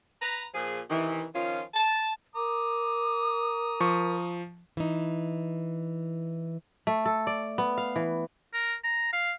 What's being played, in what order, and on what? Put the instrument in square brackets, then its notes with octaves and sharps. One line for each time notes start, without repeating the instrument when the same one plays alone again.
[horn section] B4 A#5
A#2 F3 G#4
C3 D#3 E3
D#3 F3 C#4 F4
A5
[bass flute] A#4 [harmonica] A#5 D#6 [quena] D6
[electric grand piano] F3 C#6
[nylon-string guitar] E3 D#4
[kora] A3
A4
D5
B3
F5
E3
[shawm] A#4
A#5
F5